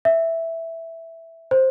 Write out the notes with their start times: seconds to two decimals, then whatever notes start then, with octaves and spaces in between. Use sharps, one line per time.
0.05 E5
1.51 C5